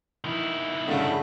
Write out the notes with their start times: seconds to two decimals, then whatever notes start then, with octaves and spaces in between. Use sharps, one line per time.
0.25 D#3 E4
0.88 D2 G2 C#3 A3